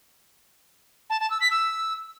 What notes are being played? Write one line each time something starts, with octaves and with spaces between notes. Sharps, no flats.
A5
A5
E6
B6
E6